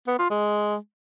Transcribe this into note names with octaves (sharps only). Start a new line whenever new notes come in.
B3
F4
G#3